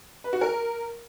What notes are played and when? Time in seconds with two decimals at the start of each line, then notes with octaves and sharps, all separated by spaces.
0.24 B4
0.33 F#4
0.41 A#4